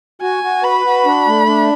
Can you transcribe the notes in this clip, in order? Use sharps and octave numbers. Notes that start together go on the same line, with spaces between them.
F#4 G#5
F#4
B4 B5
F#4
D4
A3
D4